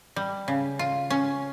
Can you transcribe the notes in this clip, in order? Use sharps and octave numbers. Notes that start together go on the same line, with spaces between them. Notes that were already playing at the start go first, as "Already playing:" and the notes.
G3
C#3
F4
C#4